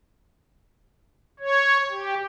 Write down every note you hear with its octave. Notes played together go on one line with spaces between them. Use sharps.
C#5
G4